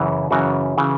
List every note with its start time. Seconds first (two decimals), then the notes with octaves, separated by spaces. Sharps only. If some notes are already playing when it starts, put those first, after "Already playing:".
Already playing: F#2 C#3 E3
0.31 F#2 C#3 E3 F#4
0.78 C#3 E3